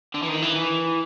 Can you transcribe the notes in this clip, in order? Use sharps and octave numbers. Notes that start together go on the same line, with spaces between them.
D3
E3
D#3
E3
E3